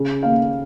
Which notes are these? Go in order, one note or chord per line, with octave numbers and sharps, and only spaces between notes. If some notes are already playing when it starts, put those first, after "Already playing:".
Already playing: C#3
D#2 F5